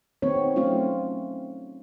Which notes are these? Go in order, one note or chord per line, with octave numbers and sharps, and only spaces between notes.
D#3 B3 C4 C#5
F#3 A3 C4 C#4 F4